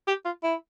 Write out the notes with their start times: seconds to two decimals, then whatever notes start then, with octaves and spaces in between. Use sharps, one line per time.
0.08 G4
0.25 F4
0.43 E4